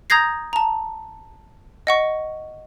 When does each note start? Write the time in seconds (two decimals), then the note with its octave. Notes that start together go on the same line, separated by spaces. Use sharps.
0.10 A#5 D#6 G6 G#6 A#6 C7
0.53 A5 A#5
1.87 D#5 F#5 C#6